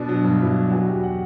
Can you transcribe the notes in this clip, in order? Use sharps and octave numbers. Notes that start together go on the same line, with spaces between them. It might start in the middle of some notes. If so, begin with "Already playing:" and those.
Already playing: B2 D4
F#3
G2
F#3 E4
F#3
E2 F#4
F#3 G4
F#5